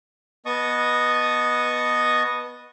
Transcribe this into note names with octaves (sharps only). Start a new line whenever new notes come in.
B3 D#5 A5 C#6 D#6